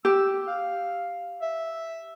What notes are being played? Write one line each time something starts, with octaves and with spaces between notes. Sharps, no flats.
G4 E6
F5
E5